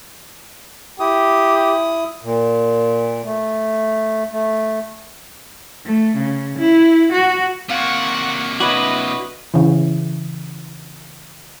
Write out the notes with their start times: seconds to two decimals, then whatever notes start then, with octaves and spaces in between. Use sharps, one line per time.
1.00 E4 G4 D#6
2.23 A#2
3.24 A3
4.31 A3
5.86 A3
6.17 C#3
6.59 E4
7.13 F#4
7.69 C3 A#3 F4 F#5 C#6
8.60 D4 E4 F#4 B4 C#5 D#5
9.54 C#3 E3